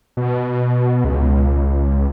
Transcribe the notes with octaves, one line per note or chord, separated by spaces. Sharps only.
B2
C#2